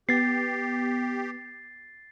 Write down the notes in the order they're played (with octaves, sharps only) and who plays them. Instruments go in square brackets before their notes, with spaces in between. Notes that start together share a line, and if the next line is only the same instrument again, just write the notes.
[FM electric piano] B3 [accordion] G4 [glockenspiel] A6 C7